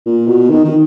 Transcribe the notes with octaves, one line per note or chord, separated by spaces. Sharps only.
A#2
B2
D#3
D#3